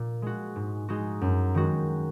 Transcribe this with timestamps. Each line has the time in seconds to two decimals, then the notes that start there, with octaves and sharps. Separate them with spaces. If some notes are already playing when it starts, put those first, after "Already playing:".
Already playing: A#2
0.22 G#3 F#4
0.56 G#2
0.89 G#3 D#4 F#4
1.21 F#2
1.54 D#3 G#3 F#4